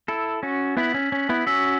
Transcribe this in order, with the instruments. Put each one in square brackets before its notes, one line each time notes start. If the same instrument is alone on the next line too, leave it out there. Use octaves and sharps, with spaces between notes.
[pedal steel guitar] E4 A4 [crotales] E6 A6 E7
[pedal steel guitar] C#4 F#4
[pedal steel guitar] B3 E4 [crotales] F#6 B6 F#7
[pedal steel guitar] C#4
C#4
B3 E4
[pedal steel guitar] C#4 F#4 [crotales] E6 B6 F#7